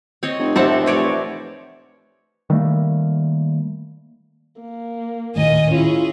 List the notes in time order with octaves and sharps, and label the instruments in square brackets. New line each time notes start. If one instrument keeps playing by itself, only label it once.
[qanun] C4 C#5 D#5
[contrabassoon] F1
[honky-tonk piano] A1 C5 E5 [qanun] C4 A4 F#5
[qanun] B4 C#5 D5
[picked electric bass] D#3 G3 A3 A#3
[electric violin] A#3
[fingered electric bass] D#1 D#2 A2 [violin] D#5 G#5
[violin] C#4 G#4 [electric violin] E4 F4